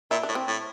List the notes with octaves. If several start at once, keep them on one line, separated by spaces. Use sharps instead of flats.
A#2 E4
D4
A2
C4
A2